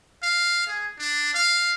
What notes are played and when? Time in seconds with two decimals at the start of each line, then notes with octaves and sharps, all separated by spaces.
0.23 F5
0.67 G#4
0.99 D4
1.35 F5